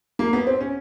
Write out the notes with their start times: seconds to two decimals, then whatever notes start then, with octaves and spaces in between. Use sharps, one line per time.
0.19 A#3
0.33 B3
0.47 C4
0.61 C#4